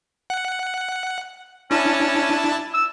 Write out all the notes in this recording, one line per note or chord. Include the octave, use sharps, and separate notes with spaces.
F#5
C#4 D4 E4 A5
E6